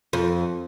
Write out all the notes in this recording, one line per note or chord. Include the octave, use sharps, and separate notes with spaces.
F2